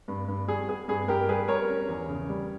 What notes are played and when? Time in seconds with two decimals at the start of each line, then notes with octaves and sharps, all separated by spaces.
0.08 G2
0.28 G2
0.48 G3 G#4
0.68 B3 G#4
0.88 G2 G#4
1.08 G2 G4 A#4
1.29 G3 G#4 B4
1.48 G3 A#4 C#5
1.68 C#4
1.89 E2
2.09 C#3
2.29 G3